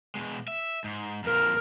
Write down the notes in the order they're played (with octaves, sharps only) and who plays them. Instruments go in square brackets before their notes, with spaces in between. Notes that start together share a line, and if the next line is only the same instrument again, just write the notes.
[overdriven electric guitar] B2 G#3
E5
G#2
[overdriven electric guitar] F2 A#2 [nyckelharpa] A#4